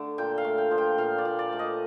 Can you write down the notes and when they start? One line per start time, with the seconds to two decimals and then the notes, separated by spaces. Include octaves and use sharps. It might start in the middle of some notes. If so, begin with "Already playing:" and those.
Already playing: D3 A3
0.18 A#2 G5
0.38 F5
0.45 A3
0.58 G5
0.71 F3
0.78 G5
0.98 A#2 F5
1.18 D5
1.25 A#2
1.39 D5
1.53 A3
1.59 D#5